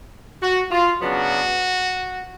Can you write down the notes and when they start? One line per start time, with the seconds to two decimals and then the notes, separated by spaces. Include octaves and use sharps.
0.41 F#4
0.71 F4
1.00 C#3 F#3 B3 D4 F#4